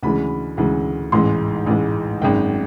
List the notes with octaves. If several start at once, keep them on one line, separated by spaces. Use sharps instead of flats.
D2 C#3 E3 G#3 B5
D2 C#3 E3 G#3
A1 G#2 E3 G#3 C6
A1 G#2 E3 G#3
G#1 F#2 D#3 G#3 G5